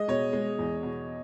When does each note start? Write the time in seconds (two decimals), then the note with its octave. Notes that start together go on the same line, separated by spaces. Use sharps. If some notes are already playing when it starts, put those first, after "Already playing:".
Already playing: G#3 D#5
0.08 B2 C#5
0.33 G#3
0.59 E2
0.83 B2